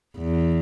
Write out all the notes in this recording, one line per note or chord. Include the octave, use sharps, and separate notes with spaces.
E2